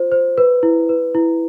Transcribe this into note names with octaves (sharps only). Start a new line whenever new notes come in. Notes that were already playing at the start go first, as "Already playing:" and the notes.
Already playing: F4 C5
C5
B4
E4
B4
E4